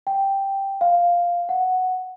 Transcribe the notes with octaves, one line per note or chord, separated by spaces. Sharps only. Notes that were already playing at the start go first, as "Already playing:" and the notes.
G5
F5
F#5